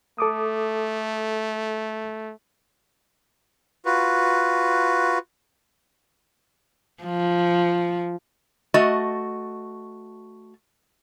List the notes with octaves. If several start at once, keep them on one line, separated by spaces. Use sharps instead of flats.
A3 A4 D6 D#6
F4 F#4 B4
F3
A3 F#4 D#5